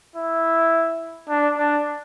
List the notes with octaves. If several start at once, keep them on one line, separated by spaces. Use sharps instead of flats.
E4
D4
D4